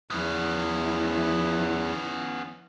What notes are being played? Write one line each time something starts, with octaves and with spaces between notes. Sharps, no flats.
E2 F3 B3 C#4 E4